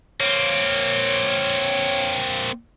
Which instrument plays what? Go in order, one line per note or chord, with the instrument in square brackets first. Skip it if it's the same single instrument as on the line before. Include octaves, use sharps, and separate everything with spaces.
[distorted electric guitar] A#3 C4 [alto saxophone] C#5